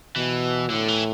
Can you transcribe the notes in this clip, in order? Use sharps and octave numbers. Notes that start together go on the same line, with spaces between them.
B2 E3
A2 D3
E3